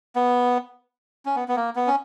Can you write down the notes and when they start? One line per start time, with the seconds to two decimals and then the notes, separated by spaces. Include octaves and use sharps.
0.16 B3
1.26 C#4
1.36 B3
1.48 B3
1.56 A#3
1.76 B3
1.87 C#4